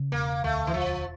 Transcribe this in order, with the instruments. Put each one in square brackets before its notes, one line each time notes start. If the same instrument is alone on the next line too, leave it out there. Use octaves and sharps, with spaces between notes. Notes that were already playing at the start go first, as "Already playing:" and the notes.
Already playing: [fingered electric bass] C#3
[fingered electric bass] E1 [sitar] A#3
[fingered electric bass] D2 [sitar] A3
[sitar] E3
[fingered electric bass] E1 [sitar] F3